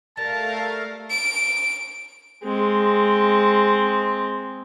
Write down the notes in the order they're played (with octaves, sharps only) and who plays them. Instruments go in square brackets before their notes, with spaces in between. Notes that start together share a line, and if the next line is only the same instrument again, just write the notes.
[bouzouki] G3 [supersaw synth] A3 F5 [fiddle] A#4 [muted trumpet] A5
[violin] D7
[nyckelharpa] G#3 C4